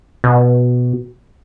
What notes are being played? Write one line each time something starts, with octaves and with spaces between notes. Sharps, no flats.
B2